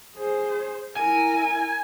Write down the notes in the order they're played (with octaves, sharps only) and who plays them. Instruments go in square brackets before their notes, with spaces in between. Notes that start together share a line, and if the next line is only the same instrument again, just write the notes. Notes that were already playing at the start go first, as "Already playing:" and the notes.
[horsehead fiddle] G#4 C5
[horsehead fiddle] E4 A#4 [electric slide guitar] G#5